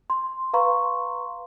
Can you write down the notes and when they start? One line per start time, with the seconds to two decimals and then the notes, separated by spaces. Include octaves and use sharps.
0.10 C6
0.53 B4 F5 A#5 C6 C#6